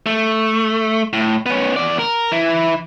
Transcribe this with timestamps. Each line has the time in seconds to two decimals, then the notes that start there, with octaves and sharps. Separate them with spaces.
0.06 A3
1.13 A2
1.46 B3 C#4
1.76 E2 D5
1.99 A#4
2.32 E3 E4